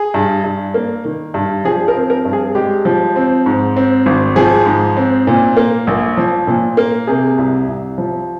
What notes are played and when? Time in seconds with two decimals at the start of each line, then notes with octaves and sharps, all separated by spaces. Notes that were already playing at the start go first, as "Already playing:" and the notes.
Already playing: G#4
0.14 G2
0.44 G2
0.74 A#3
1.05 D#3
1.34 G2
1.65 F3 G#4
1.88 A#4
1.95 C4
2.10 A#4
2.25 G2
2.33 G#4
2.55 G#3 G4
2.85 F3
3.16 C4
3.46 G#2
3.76 C4
4.06 G#1
4.36 F3 G#4
4.66 G#2
4.97 C4
5.27 A#2
5.57 A#3
5.87 A#1
6.17 F3
6.47 A#2
6.77 A#3
7.07 C3 G#4
7.38 C2
7.68 C2
7.98 F3